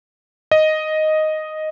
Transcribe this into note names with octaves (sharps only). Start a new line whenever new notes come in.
D#5